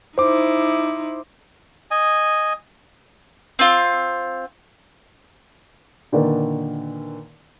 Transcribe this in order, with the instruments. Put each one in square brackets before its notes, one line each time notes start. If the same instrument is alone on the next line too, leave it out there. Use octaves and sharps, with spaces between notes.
[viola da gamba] D#4 E4 [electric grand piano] C5 D6
[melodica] D#5 G#5
[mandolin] C4 F4
[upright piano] A#2 D3 D#3 D#4 B4 D5